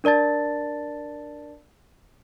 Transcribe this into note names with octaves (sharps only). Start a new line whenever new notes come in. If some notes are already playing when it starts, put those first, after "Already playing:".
D4 A#4 D5 A5 A6